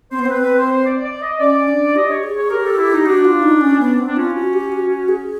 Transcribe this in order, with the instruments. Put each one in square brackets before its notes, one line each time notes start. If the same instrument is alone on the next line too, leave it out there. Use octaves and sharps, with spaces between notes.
[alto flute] C4 [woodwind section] C5
[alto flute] B3
[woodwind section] C5
[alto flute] C4 [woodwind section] B4
[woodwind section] B4
C5
C5
D5
D5
D#5
[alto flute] C#4 [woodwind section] D5
[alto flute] D4
[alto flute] G4 [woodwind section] D#5
[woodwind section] C#5
[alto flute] G#4
[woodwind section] C#5
[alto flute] G4 [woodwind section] A#4
[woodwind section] A4
E4
D#4
[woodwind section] D4 [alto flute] F#4
[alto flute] F4
D#4
C#4
B3
C4
[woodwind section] D4
[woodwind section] C#4 [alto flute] F4
[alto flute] F#4
G4
F#4
F#4
G#4